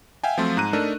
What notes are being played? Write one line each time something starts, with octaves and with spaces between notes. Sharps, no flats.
E5 F5 G5 G#5
F3 F#3 A3 C4 F4
G#2 A#5 F#6 D#7
A3 D4 D#4 A4 A#4